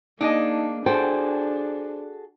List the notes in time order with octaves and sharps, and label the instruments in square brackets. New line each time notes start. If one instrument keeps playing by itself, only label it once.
[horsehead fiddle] A#3 [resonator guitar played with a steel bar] D4 G#4 D#5 [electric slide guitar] D#4
[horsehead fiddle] D4 [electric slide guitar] F#4 G#4 A4 [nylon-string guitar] C5 [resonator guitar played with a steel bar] G5